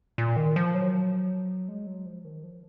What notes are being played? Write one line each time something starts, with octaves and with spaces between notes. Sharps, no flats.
A#2
D#3
F3
F#3
G#3
F#3
F3
D#3
F3